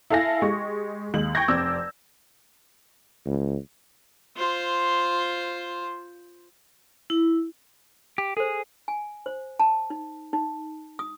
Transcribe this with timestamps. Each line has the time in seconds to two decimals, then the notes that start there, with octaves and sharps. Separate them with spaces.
0.10 E4 A4 F5 G#5 A#6
0.42 G#3 G4 C#6
1.14 D#2 G#3 F#7
1.35 G5 C#6 G6 G#6 A#6
1.48 F1 C4 D5 D6 E6
3.26 C#2
4.37 F4 C5
7.10 E4
8.18 G4
8.37 G#4 A4 C5
8.88 G#5
9.26 C5
9.60 A5
9.90 D#4
10.33 D#4
10.99 D#6